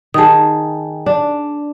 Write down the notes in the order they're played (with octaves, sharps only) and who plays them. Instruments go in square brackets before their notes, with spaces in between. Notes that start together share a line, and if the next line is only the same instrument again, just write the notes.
[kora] D#3 G#4 [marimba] A5 D#6
[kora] D4